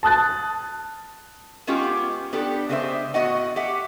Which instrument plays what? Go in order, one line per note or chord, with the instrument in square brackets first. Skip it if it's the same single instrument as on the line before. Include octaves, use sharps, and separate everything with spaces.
[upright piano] A5 D#6 F#6 A6
[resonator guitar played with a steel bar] G#3 B3 C#4 F4 G4
B3 D4 G4 A4
C#3 G#3 D4 G#4 C5 E5
A2 B3 F#4 D#5 F#5
G4 E5 F#5